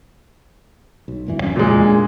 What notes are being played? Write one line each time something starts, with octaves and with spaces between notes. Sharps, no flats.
B1
F1 G2 E3
D1 F#2 C#4
D#1 F2 A#2 C#3 G#3
D4